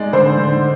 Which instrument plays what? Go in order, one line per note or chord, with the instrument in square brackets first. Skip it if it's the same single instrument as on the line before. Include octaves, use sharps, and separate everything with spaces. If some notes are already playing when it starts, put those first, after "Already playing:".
Already playing: [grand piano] G#3 D#4 [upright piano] D5
[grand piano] D3 [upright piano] C5
[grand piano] D3